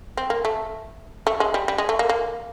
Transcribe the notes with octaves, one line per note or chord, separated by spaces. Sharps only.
C4
A#3
A3
A3
G#3
G3
G3
G#3
A3
A#3
A#3